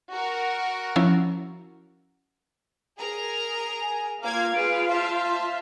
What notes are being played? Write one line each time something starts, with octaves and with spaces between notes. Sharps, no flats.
F#4 A#4
F3 C#4 E4
G#4 A#4 A#5
G#5
A#3 F4 F5 A#5 D6 G#6
G#4 B4 D7
C5 E5 A5 C6